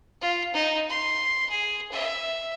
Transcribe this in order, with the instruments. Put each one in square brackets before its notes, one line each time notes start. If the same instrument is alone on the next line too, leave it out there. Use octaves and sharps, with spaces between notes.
[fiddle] F4
D#4
C6
G#4
E5